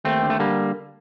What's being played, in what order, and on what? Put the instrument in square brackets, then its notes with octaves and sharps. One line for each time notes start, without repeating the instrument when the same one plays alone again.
[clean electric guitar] D#2 A3 C4
D3
A3
D3 G3 A#3